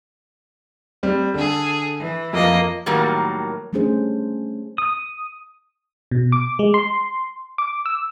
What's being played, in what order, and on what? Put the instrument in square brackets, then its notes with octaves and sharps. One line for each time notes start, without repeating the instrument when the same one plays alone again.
[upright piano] G3 C4
[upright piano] D3 [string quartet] G#4 A4
[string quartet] E3
[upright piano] F2 [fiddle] A#3 D#5
[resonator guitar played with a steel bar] A2 D#3 F#3 G3 A#3 A#4
[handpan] G3 A3 C#4 D4 G#4 C5
[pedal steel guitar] D#6
[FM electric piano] B2
D6
G#3
C6
D6
E6